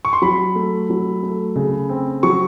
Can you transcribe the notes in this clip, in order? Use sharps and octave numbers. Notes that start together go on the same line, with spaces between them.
C#6
C6
F#3 B5
A3
F#3
A3
C#3
C4
F#3 C#6